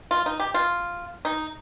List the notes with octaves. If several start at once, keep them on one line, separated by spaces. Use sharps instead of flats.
F4
D#4
G4
F4
D#4